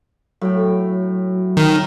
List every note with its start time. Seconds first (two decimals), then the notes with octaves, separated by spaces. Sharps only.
0.41 A2 F#3 G5
1.57 D#3